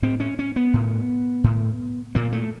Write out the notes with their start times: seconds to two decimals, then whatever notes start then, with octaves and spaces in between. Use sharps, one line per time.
0.02 A2 C4
0.20 C#4
0.39 C#4
0.56 B3
0.74 A2
1.44 A2
2.15 A#2 A#3
2.32 A3